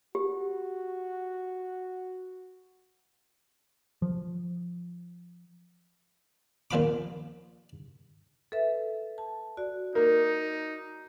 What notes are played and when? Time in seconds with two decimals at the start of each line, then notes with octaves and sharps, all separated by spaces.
0.15 F#4 G4
4.02 F3
6.71 D#2 A#2 F3 F4 B5 D6
8.52 A4 B4 E5
9.18 A5
9.57 F#4 D5
9.95 A#3 D#4